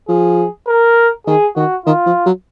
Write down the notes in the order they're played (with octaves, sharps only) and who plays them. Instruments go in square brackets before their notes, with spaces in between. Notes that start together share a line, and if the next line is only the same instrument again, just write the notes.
[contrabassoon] F3 [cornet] G#4
[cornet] A#4
[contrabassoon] D#3 [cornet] G#4
[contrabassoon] D#3 [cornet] F#4
[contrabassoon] D#3 [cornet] F4
[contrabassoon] F3
F#3